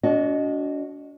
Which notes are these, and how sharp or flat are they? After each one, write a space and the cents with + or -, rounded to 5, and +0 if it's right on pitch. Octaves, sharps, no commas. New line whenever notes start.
D4 -40 F#4 +0 D#5 +0